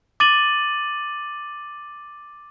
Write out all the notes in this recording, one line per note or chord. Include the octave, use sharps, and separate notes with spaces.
D6 A6 D#7 F#7